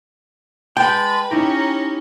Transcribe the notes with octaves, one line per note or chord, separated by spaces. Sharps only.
G#3 B4 G5 A5 B5
C#4 D#4 E4 G4 A#5